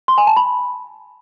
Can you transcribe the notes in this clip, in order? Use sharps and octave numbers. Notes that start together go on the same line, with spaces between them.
C6
G#5
A5
B5